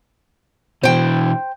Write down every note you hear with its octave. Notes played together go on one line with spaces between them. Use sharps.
B2 E3 C5 G5